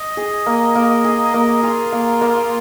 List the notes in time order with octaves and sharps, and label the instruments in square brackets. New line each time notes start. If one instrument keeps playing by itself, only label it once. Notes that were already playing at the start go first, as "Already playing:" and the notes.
Already playing: [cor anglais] D#5
[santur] G#4
A#3
A#3
G#4
A#3
[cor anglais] F4 [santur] G#4
[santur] A#3
A#3